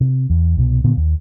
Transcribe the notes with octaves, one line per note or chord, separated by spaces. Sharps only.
C3
E2
C2 B2
A#2 D3 B3
D#2